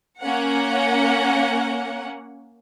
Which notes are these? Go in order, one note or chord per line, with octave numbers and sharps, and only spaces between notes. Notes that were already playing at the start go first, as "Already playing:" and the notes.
A#3 C#4 F#5